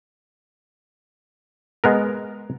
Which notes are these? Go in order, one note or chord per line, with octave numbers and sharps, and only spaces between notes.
G#3 B3 A#4